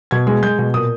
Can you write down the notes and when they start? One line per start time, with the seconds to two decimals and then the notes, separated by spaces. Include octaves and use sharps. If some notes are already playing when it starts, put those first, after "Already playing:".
0.11 B2 G#6
0.27 G#3
0.43 G#3 G6
0.59 B2
0.74 A#2 D#6